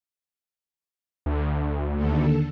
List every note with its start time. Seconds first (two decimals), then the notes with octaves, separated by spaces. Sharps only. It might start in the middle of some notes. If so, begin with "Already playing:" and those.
1.26 D2
1.94 D#2 D3 A4